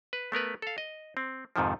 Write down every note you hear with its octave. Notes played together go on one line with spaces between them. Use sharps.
B4
A3 B3 A#4 B4
A4 F5
D#5
C4
F2 G#2 C3 D#3 F3